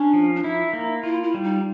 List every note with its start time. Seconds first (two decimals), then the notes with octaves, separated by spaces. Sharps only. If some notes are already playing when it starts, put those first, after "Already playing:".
Already playing: C#4 D4
0.13 F3
0.36 D4
0.44 D#4 E4
0.73 A#3
1.03 E4 F4
1.23 E4
1.34 G3
1.44 D#4